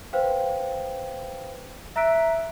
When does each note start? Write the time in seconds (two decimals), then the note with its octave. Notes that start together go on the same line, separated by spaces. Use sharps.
0.13 B4 C5 F5 G5
1.96 E5 A#5 E6 F#6 B6 D7